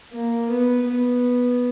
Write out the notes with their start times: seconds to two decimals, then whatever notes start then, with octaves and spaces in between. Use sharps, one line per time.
0.12 A#3
0.49 B3
0.87 B3